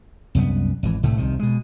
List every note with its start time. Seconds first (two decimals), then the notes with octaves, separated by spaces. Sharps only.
0.35 C2 F#2 F#3 B3
0.83 G#1 E3
1.03 C2 A2 D3 A3
1.17 C2 C3 D#3
1.39 B2 G#3